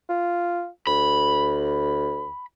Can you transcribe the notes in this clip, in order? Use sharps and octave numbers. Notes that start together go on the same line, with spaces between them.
F4
D2 B5